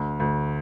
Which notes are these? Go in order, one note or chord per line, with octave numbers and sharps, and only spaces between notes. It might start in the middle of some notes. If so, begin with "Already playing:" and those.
Already playing: D2
D2